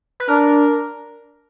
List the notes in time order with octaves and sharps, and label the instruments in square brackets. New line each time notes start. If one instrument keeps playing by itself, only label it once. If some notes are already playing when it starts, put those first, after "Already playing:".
[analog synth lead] B4
[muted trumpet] D4 [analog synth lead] A#4